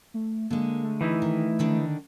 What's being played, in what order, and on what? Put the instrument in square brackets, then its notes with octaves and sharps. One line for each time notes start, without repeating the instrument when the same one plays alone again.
[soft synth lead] A3
[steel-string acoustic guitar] D3 G#3 [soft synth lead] A#3
[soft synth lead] A3
[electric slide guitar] E3 D#4 E4
[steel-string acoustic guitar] D#3
D3 D#3 D4